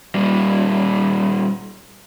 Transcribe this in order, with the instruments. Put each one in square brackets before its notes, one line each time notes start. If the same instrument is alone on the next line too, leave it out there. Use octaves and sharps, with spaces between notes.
[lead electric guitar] A#2 G3